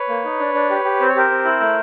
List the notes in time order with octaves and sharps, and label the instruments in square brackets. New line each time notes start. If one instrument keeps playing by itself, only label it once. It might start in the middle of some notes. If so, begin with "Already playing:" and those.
Already playing: [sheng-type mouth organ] B4 C#5
A#3
D#4
D4
D4
G4
G4
C4 C5
C#5
G4 A#4 C5
C4
E4
A3